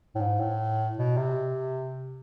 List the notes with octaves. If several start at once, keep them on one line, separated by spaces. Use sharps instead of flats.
A2
G#2
A2
B2
C3